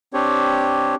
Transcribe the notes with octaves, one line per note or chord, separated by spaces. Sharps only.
C4 D4 G4 C#5